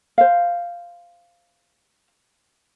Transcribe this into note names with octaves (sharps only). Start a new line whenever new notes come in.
C5 F5